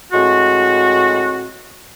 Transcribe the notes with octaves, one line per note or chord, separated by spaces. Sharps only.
A2 G#3 C4 F#4